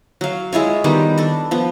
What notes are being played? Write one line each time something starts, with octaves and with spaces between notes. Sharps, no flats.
F#3 F5
G#3 E4 F4 C#5
D#3 G3 B3 G4
D4 A4
F3 B3